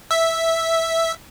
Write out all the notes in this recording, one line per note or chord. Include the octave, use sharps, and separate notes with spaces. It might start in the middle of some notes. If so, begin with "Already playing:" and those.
E5